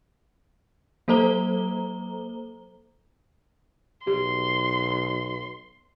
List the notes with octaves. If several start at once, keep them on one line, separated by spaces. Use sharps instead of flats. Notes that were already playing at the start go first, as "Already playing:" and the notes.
F#3 A#3 A4 C5 A#5 G7
B1 G4 C6